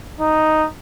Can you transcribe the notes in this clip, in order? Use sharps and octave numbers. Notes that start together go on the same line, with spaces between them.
D#4